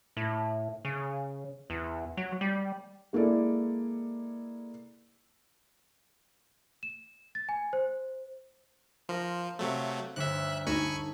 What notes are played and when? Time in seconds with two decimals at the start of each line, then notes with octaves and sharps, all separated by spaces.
0.17 A2
0.85 C#3
1.70 E2
2.17 F#3
2.41 G3
3.13 G#3 A#3 E4 A4 D5
6.83 E7
7.35 A6
7.49 G#5
7.73 C5
9.09 F3 A#4 F5 C6
9.59 C3 F#3 A3
10.16 G1 D2 E5 F#6
10.67 D2 D#4 A4 G#5 B5 C#6